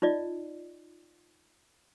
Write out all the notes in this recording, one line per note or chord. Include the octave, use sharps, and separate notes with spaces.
D#4 F4 D5 D#5